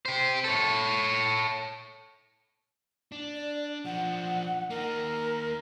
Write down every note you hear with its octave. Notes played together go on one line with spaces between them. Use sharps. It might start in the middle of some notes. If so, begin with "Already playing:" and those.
G4 C5
A4 C#5
D4
D5
F3 D4 F#5
A#3 D#4 A#4